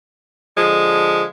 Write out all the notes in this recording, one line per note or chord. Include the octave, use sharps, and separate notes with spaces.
D3 F3 G#3